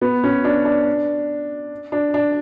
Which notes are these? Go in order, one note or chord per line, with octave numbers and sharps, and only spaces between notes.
B3
C#4
D4
D4
D4
D4